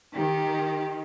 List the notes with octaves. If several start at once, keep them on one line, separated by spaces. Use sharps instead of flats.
D#3 G4